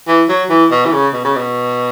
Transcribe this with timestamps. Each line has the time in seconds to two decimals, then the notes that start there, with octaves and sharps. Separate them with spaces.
0.08 E3
0.29 F#3
0.50 E3
0.71 B2
0.86 E3
0.93 C#3
1.14 B2
1.25 C#3
1.36 B2